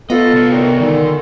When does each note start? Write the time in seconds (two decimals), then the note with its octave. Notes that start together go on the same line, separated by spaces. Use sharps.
0.10 B3 F4 A4 D#5
0.33 C2 C#5
0.51 A#2 D#3 F#4
0.80 A#2 D3 D#3